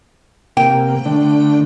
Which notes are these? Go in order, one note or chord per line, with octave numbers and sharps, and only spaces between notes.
C3 A#3 G5
D3 A3 D4